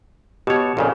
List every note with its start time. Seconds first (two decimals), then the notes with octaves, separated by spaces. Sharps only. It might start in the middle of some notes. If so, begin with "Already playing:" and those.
0.47 B2 G4 C#5
0.77 F2 A#2 C#3